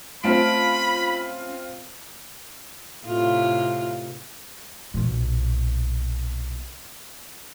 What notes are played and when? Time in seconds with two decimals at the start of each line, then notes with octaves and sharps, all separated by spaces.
0.24 A3 C4 C#4 F4 A5 B5 D7
3.06 A2 C3 F4
4.94 B1 A#2